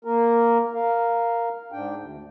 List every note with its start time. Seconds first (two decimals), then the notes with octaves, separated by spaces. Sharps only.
0.05 A#3 A#4
0.74 A#4 F5
1.72 G#2 D4 G5
1.96 D2